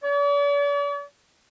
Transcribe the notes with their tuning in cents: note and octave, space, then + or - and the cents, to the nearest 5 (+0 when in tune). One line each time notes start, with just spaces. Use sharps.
D5 -45